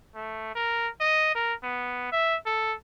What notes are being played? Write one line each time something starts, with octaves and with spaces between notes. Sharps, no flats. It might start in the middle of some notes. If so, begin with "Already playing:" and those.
A3
A#4
D#5
A#4
B3
E5
A4